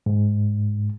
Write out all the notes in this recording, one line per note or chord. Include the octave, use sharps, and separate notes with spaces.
G#2